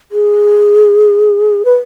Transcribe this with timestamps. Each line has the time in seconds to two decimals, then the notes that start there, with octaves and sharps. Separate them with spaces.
0.12 G#4
1.65 B4